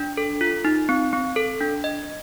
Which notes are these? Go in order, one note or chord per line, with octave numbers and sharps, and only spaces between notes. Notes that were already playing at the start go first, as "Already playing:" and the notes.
Already playing: D4
A4
F4
D#4
C4
C4
A4
D4
D#5